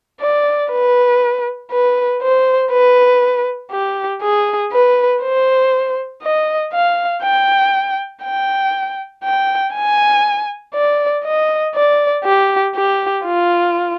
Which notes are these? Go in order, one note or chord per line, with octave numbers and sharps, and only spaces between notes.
D5
B4
B4
C5
B4
G4
G#4
B4
C5
D#5
F5
G5
G5
G5
G#5
D5
D#5
D5
G4
G4
F4